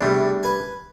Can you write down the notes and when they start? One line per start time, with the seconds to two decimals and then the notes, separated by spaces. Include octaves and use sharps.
0.01 E2 C3 G3 A3 D4
0.43 B4 G#5